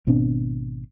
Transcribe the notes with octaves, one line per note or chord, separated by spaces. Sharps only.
G#1 B2 C4 D4